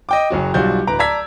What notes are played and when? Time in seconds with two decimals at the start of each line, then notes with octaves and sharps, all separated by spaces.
0.09 D#5 G5 D6
0.30 F#1 F#3 F#4
0.54 B1 G3 F4 F#4 G6
0.87 D1 B4 A#5 D7
0.99 D5 A5 A#5 E6 G#6 B6